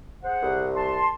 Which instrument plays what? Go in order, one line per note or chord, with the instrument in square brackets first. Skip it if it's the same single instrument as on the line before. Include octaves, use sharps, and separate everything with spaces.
[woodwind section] G#4 C5 F#5
[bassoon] C2
[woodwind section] A5 C6